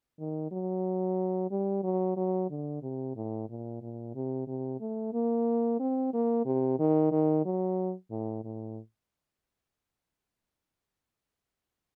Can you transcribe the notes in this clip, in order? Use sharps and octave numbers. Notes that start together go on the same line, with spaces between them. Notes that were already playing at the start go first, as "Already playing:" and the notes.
D#3
F#3
G3
F#3
F#3
D3
C3
A2
A#2
A#2
C3
C3
A3
A#3
C4
A#3
C3
D#3
D#3
F#3
A2
A2